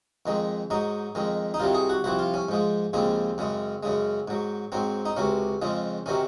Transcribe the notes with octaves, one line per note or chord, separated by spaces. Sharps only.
F2 D#3 G#3
G#2 F#3 D#4
F2 D#3 G#3
D#4
C2 C3 D#3 F#3 F4
G#4
F#4
C2 C3 F3 F#4
F4
C#4
G#2 F3 G#3
D#2 C#3 F3 G#3 C4
F#2 C#3 G#3
F#2 C#3 G#3
G#2 F#3
G#2 F#3 C4
D#4
C#2 C3 F#3 C#4
F2 C#3 F3 G#3
C3 D#3 F#3 C#4